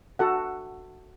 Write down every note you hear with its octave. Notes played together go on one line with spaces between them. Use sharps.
F#4 A4 F#5